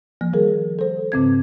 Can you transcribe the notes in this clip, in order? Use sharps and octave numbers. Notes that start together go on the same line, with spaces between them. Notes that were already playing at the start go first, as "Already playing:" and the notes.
F3 A#3
D#3 G3 G#4 A#4
A4 C5
G#2 C#3 C4 G#6